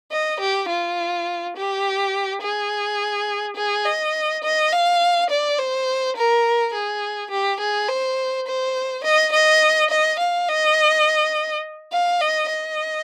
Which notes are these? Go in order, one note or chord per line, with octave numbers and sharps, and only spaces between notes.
D#5
G4
F4
G4
G#4
G#4
D#5
D#5
F5
D5
C5
A#4
G#4
G4
G#4
C5
C5
D#5
D#5
D#5
F5
D#5
F5
D#5
D#5